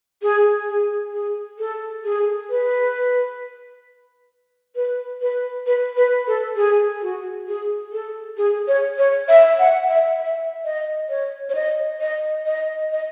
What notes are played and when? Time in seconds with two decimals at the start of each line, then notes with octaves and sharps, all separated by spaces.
0.22 G#4
0.68 G#4
1.13 G#4
1.59 A4
2.04 G#4
2.50 B4
4.75 B4
5.21 B4
5.66 B4
5.97 B4
6.27 A4
6.56 G#4
7.02 F#4
7.48 G#4
7.92 A4
8.37 G#4
8.68 C#5
8.98 C#5
9.28 E5
9.59 F#5
9.89 E5
10.19 E5
10.65 D#5
11.09 C#5
11.49 C#5
11.55 D#5
12.01 D#5
12.46 D#5
12.91 D#5